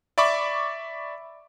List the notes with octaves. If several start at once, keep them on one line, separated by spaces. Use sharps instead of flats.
D5 E5 B5 C#6 D6